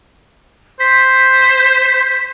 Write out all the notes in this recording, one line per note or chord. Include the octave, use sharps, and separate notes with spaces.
C5 B6